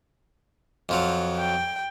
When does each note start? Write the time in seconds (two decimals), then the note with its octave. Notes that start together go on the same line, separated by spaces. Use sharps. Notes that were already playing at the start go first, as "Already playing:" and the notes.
0.89 F2 F3 F#3
1.38 G5